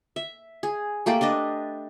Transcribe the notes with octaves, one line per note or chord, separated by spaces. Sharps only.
E5
G#4
A3 A#3 G4 D5
D4 B4 D#5 A5